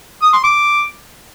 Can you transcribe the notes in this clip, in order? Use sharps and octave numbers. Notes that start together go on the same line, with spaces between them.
D#6
C6
D6